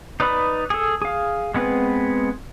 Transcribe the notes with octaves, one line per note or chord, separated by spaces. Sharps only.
D#4 B4 D5 B5 D#6
G#4 A4
G#4 F5
G#3 B3 C4 G#4 B4